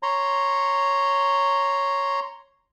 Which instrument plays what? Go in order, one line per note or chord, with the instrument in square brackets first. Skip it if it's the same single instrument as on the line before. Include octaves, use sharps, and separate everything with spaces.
[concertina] C#5 A#5 C6